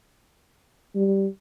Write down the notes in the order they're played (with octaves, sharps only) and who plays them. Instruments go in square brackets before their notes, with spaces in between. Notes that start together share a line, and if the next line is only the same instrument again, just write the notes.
[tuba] G3